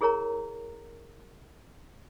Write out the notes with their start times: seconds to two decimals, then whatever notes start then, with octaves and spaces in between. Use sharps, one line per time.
0.01 E4 G#4 A#4 C#5 A#5